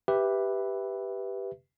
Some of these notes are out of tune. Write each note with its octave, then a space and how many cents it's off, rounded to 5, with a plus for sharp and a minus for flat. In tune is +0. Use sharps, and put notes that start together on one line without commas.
G4 +0 B4 +0 E5 +0